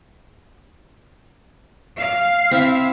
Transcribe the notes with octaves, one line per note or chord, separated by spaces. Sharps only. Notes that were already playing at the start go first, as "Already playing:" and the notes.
F5
C4 E4 E5